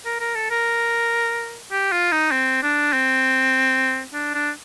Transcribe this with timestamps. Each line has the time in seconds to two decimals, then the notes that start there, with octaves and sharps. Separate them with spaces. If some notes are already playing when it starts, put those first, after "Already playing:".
0.05 A#4
0.20 A#4
0.35 A4
0.50 A#4
1.72 G4
1.92 F4
2.12 D#4
2.32 C4
2.63 D4
2.93 C4
4.13 D4
4.34 D4